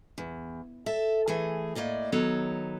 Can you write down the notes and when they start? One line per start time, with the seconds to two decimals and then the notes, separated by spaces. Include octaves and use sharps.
0.18 E2
0.86 A4 E5
1.28 E3 A3 G#4
1.75 A2 A#3 D5 D#5
2.12 D#3 F#3 B3 A4 C#5